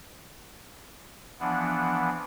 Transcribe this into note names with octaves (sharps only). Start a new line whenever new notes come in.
E3 F3 B3 D4 F#5